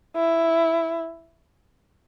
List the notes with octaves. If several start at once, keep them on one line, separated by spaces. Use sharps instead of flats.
E4